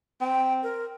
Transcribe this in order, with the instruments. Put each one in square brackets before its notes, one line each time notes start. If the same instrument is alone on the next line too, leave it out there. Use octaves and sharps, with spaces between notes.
[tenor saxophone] C4 [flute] G5
[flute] A#4